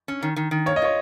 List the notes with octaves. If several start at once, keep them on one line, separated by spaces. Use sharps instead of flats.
C#4
D#3
D#3
D#3
A#3 C#5
D#5
F4 C#5